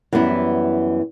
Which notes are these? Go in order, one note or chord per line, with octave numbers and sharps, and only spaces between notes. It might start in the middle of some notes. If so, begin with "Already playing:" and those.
F#2 E3 G3 B3 E4